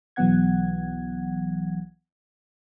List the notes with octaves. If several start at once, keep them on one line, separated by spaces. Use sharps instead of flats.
B1 E3 F#3 B3 F#5 G#6